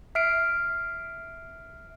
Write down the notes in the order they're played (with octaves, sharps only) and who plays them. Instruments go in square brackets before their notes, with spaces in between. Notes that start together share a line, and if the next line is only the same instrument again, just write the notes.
[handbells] E5 F6 C7 D7